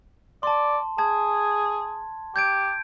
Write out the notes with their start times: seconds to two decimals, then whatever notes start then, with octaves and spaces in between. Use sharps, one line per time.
0.43 D5 A5 C6
0.98 G#4 A5 G#6
2.36 G4 G6 G#6 D7